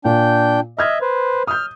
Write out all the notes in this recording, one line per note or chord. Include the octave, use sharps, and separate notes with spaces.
A#2 D4 G5 G6
D#5 E5 F6 G#6
B4 C5
D#6 F6 G6